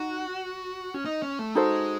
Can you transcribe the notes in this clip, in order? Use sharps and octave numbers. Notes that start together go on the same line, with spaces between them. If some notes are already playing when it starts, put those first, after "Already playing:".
Already playing: D#4 F#4
C#4
D#4
C#4
A3
G#3 D#4 F#4 A4 C5